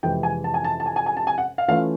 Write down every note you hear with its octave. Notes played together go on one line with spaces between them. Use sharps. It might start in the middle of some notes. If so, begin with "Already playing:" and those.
F2 C3 E3 G#3 G5
G#5
A5
G#5
A5
A5
G#5
G#5
G#5
A5
G#5
F#5
F5
E3 A3 C#4 F4 F5